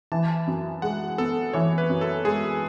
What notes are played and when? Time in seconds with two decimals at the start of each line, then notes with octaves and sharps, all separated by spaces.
0.12 E3 A5
0.47 F#2
0.82 G#3 F#5
1.18 B3 A4
1.53 E3 C#5
1.78 B4
1.89 F#2
2.01 A4
2.25 G#3 G#4